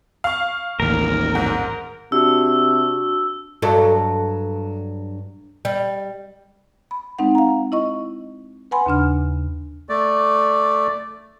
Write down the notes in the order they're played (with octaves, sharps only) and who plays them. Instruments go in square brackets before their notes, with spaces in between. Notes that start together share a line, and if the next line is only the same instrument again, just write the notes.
[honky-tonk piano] F5 C#6
[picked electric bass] A1 D#2 [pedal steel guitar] A#4
[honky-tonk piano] G#2
[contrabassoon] C3 [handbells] D4 F#4 [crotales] E6
[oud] G2 F#3 A4
G3
[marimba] B5
G#3 C4 D#4 F#5
F5 A#5
E4 D#5 C#6
B4 F#5 G#5 B5 C6
D#2 C#3 D4 F6
[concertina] A3 D5